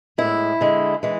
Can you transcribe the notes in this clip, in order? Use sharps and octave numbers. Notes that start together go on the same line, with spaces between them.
A2 G#3 E4
D3 G#3
E3 G#3